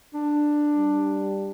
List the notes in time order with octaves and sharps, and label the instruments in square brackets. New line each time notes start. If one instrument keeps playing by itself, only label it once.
[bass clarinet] D4
[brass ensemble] G3